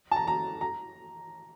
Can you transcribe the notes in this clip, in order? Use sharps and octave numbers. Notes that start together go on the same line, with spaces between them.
A5
A#5
A#5
A#5